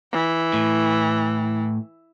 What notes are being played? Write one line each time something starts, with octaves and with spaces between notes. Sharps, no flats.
E3
A2